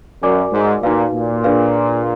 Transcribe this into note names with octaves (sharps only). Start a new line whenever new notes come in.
F#2 F#4 A#4 D5 G#5 D6
G#2
A#2 D#4 F#4 B4 F5
A#2
D4 G#4 B4 F5